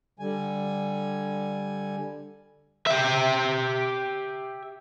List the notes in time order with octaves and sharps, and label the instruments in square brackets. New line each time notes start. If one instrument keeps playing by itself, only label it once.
[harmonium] D3 G3 G#5
[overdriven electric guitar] G4 E5